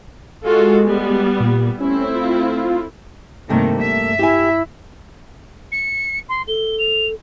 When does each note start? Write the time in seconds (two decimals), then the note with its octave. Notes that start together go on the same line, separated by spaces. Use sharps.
0.44 G#3 F4 F#4 A4
0.84 G3 B3
1.40 A#2
1.80 A3 C4 C#4 E4
2.14 F4
3.49 G2 C3 D#3 G3 A3 A#3
3.81 E5
4.19 E4 G4 G#5
5.72 C#7
6.29 C6
6.48 A4 G7
6.79 F7